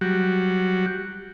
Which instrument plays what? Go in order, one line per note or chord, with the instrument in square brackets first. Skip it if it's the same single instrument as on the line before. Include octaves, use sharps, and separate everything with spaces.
[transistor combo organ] F#3 G3 F#4